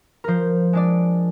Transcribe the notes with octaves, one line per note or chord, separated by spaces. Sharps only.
F3 A#4 C5
G#3 D4 D5